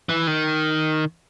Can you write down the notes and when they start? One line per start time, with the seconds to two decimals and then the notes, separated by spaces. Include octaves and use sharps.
0.09 E3
0.27 D#3